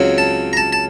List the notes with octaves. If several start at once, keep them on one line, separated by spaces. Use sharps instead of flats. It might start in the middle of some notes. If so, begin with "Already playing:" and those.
Already playing: C#2 C#3 F#3 C4
A5
A#5
A5
A5